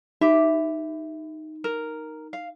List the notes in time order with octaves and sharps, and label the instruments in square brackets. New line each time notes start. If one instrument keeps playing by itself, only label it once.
[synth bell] D#4 [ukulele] G4 E5
[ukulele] A#4
F5